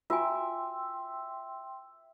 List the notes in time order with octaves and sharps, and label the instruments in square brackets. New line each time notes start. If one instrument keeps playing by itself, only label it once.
[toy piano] F4 F#4 G#5 [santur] E5 [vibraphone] G5 C6